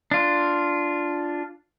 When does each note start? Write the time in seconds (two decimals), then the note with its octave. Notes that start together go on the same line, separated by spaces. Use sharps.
0.11 D4 F4